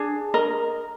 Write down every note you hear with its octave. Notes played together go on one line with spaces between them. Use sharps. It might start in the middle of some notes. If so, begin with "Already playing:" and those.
Already playing: D4 G#4
A#4 D#5